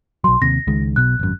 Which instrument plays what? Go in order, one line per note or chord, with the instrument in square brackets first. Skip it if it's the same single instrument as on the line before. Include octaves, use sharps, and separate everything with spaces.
[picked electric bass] B1 F#3 [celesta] C6
[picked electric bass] D#2 C3 [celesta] A#6
[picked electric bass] C#2 D#3 G#3
[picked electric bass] B1 B2 [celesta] F#6
[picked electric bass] G#1 F#2